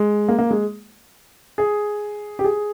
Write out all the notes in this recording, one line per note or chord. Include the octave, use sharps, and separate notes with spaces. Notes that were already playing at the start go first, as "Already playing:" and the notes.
Already playing: G#3
A#3
A#3
G#3
G#4
G4
G#4